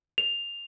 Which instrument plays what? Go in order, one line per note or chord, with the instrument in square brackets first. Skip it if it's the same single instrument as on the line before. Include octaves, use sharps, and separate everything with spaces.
[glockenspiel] F7